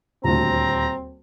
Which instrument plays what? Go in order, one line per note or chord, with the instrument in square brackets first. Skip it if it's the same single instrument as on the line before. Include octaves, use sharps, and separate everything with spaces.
[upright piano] D#1 D2 [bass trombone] C4 [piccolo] A#5